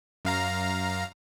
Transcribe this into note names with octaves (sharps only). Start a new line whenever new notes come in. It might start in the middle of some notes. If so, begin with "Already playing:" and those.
F#2 F5 A#5